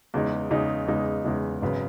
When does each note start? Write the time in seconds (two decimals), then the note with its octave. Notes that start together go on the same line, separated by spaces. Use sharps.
0.14 E2 C#3 G#3 D#4
0.50 E2 C#3 G#3 D#4
0.87 E2 C#3 G#3 D#4
1.25 E2 C#3 G#3 D#4
1.62 G#1 F#2 C#3 G#3 B3